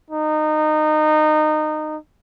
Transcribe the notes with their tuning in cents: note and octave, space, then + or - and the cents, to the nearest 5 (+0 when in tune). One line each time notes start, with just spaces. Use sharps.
D#4 -20